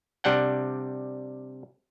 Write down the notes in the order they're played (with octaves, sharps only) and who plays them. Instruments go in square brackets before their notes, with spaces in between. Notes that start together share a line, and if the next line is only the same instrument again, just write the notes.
[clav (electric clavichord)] C3 G3 D4 F#5 G5